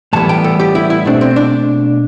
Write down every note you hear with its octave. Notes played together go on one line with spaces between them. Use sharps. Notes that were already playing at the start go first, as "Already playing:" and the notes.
A2 E3 G3 B3 A5
G5
A4
G4
E4
E4
B2 A3 C4 D4
C4
D4